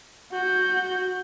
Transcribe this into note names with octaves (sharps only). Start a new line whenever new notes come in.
F#4 G6